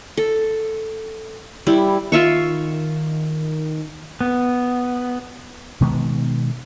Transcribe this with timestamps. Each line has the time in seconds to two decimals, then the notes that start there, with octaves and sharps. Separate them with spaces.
0.17 A4
1.67 G3 E4
2.12 D#3 F4 E5 C#6
4.21 B3
5.81 B2 D#3 G#3 B3